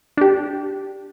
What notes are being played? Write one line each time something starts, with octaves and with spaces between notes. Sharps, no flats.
D4 G4